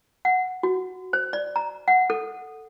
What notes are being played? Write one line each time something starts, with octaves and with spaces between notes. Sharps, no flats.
F#5
F#4
C5
D5
A#5
F#5
A4